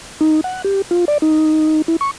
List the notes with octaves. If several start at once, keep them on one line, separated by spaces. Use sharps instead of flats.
D#4
F#5
G4
F4
D5
D#4
E4
C#6